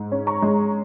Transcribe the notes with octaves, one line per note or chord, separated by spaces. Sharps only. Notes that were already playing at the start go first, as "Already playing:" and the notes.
Already playing: G#2
C#4
A#5 C#6
G#3